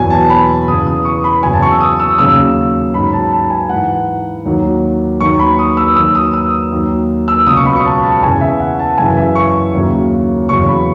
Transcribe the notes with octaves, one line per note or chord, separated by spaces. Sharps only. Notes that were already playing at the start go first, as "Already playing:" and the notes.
Already playing: E2 B2 F#3 G#5
A5
B5
E2 C#3 E3 D#6
D#6
C#6
B5
E2 C#3 F#3 G#5
A5
C#6
E6
D#6
E6
D#2 C#3 F#3 E6
G#2 F#3 B5
A5
A5
G#5
G#2 E3 F#5
D#2 D#3 F#3
D#2 D#3 F#3 C#6
B5
D#6
E6
D#2 D#3 F#3 E6
D#6
E6
D#2 D#3 F#3
E6
C#2 B2 F#3 D#6
C#6
B5
C#6
A5
A5
E2 C#3 E3 G#5
E5
F#5
A5
F#2 C#3 E3 G#5
E5
C#6
D#2 C#3 F#3
E2 C#3 F#3 C#6
B5